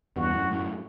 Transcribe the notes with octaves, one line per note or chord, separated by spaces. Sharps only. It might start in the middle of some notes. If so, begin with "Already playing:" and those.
E2 G2 F#4
F#2 A2
F#2 A2